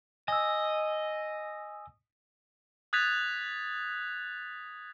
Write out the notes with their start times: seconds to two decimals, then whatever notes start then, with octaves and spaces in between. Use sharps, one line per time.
0.28 D#5 G#5 E6
2.93 D#6 F#6 G#6 A6 B6 F7